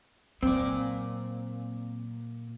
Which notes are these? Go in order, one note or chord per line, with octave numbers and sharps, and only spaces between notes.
A#2 F#3 C4 D5